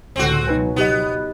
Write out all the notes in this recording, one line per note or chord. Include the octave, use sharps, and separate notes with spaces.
C#2 A2 D3 C4 F#4
B2 F#3 D#4 B4 G#5
B3 D#4 G4 D#5